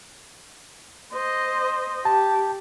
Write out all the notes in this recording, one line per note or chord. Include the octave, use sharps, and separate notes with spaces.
C5 D#5
G4 A5